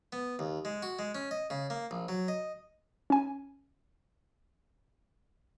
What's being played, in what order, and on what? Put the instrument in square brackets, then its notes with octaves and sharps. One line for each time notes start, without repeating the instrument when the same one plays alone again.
[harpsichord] B3
D#2
G#3
F#4
G#3
C#4
D#5
C#3
A#3
A#1
F#3
D#5
[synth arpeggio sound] C#4 G#5